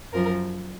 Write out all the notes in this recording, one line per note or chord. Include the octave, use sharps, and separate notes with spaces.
F#2 F3 A#4